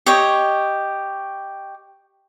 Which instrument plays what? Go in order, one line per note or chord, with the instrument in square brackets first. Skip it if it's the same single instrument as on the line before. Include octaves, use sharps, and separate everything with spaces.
[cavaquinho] G4 C#5 D#5